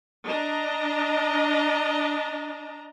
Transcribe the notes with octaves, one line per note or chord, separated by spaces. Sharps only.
D4 D#5 A#5